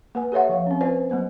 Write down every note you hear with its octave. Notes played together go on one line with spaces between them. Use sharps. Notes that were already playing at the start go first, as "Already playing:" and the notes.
A#3 B4 G#5
G4 A4 C#5 E5 F#5
F3 F5
C4 C#4
F4 B4 C5 D5 G#5
F#3 A#3 B3 C5